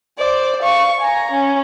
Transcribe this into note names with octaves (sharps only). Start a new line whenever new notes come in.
C5 D5
F5 C#6
G#5 A#5
C#4